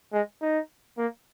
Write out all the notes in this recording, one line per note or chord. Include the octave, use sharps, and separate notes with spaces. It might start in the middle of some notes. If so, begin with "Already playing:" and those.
G#3
D#4
A#3